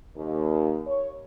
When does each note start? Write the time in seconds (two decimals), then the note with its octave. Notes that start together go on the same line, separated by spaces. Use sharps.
0.16 D#2
0.87 C#5